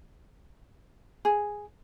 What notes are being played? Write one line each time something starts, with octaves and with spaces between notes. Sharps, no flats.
G#4